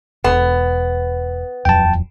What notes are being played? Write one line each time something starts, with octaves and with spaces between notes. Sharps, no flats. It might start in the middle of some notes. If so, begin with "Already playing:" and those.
E1 B3
D#1 F2 F#3 G5 A5